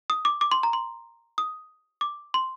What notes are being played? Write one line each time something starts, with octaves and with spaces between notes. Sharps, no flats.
D#6
D6
D6
C6
A#5
C6
D#6
D6
C6